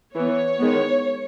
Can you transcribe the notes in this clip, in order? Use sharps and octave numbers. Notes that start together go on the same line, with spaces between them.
E3 B3 C#5
D#3 G#3 B3